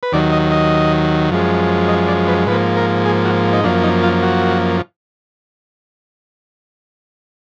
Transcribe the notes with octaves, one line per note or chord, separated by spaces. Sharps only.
B4
D#2 D#3 F#3 D5
D#5
D#5
F#2 F3 G#3
D#5
D5
B4
G#2 F3 A#3 B4
A#4
G#4
F#4
D#4
F#2 F3 A#3 D4
D#4
F4
F#4